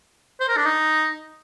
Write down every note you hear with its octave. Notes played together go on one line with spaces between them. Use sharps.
C5
A#4
D4
D#4